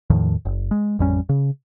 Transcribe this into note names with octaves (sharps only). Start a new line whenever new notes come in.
E2 A2 D#3 F3
F#1
G#3
A1 F2 G3 C#4
C#3